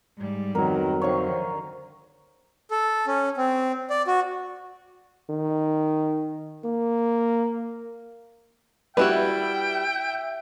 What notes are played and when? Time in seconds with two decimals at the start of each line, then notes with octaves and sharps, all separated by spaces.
0.17 G#2 G3
0.55 F2 D#3 F#3 B3 A#4
1.02 D3 D#3 C5 C#5 F5 C#6
2.71 A4
3.07 C#4
3.37 C4
3.90 D5
4.07 F#4
5.30 D#3
6.65 A#3
8.97 G3 E4 F#4 B4 E5 G5